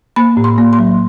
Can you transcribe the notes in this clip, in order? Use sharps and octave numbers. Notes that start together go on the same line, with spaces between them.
A#3 B5
A2
C6
A#3
C6
F#3